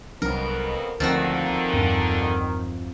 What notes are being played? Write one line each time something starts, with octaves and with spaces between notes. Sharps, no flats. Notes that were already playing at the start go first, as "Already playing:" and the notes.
C2 F2 B2 F#3 D4 A#4
D2 A#2 D3 D#3 F3 C4 F#4
E2 G2 D4